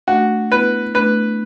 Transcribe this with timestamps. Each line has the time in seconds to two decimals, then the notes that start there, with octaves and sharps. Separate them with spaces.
0.07 A3 D4 F#4
0.51 B3 E4 B4
0.94 A3 D4 B4